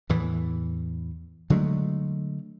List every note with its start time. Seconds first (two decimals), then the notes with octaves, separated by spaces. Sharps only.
0.09 E2 A2 E3
1.50 D3 F#3 G#3 A3